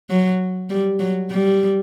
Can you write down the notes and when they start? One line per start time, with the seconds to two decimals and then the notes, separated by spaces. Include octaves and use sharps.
0.10 F#3
0.70 G3
0.99 F#3
1.31 G3